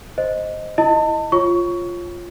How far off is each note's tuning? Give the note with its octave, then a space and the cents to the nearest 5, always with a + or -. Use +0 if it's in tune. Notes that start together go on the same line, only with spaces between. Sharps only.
C5 +0 D#5 +0
E4 +0 D#5 +0 A5 +35
F4 +0 C#5 -20 C#6 +20